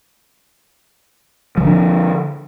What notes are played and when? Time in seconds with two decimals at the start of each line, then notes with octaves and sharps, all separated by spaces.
1.57 F3
1.60 D#3
1.63 D3
1.66 D4